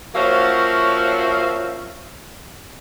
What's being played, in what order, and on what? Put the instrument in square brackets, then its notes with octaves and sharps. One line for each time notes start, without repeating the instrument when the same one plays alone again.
[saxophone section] F3 A#3 C#4 F#4 E5 F5